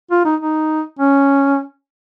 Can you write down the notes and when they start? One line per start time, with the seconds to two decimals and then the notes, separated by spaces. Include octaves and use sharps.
0.11 F4
0.25 D#4
0.40 D#4
0.99 C#4